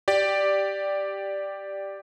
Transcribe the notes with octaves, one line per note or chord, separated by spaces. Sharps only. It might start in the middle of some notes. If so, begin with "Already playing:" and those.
G4 D5